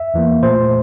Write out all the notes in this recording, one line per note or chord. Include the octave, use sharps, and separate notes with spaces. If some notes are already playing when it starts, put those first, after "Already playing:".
Already playing: E5
E2 E3 A#3
A#2 A3 C5